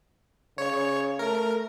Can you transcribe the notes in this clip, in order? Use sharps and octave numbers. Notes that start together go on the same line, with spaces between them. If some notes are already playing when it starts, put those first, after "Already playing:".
C#3 C#5
A3 A#4